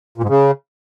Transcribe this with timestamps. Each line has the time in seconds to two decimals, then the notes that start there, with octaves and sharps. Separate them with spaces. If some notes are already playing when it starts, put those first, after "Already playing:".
0.18 A#2
0.23 G#2
0.29 C#3